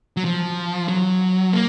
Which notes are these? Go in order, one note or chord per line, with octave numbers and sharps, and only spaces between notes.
F#3
F3
F#3
A#3